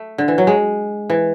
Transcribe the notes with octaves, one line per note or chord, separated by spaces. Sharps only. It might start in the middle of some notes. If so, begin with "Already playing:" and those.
Already playing: A3
D3
E3
F#3
G#3
E3